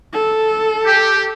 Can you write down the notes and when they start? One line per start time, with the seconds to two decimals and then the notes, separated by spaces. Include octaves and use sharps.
0.13 A4
0.85 G4